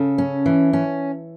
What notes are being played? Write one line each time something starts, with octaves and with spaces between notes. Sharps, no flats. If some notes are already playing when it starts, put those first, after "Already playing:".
Already playing: C#3 A4
C#4
E3
C#4